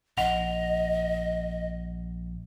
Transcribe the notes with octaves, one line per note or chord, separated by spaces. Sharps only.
A#1 D#5 F#5 F7